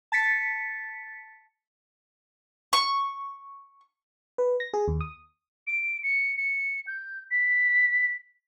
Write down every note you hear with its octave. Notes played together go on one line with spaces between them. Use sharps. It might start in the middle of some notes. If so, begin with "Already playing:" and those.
A5 A6 B6 C#7
C#6
B4
A#6
G#4
D#2
D#6
D7
C#7
C#7
G6
B6